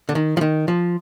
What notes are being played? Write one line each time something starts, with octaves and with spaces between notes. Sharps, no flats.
D3
D#3
F3
D#3
F3